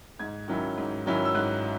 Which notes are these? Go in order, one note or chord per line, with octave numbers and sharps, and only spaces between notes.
G#2 G#6
D#3 F#3 C#4 E4
G#2
D#3 F#3 C#4 E4
E6
G#2 F#6